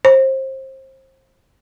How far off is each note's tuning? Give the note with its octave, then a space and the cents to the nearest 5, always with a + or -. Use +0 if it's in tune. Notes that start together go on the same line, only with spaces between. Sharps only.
C5 +25